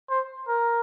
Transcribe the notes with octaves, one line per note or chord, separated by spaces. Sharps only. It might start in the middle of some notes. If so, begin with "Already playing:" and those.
C5
A#4